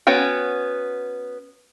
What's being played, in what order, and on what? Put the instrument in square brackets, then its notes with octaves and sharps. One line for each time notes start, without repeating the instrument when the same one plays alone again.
[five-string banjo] B3 C#4 F#4 G5